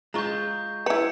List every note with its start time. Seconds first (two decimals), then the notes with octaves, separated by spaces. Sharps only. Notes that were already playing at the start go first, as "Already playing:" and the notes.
0.14 G#3 F4 A#5 C#6 G6
0.86 E4 B4 A#5 C#7